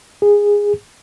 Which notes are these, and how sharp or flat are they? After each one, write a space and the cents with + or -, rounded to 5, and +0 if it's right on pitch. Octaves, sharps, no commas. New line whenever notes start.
G#4 -15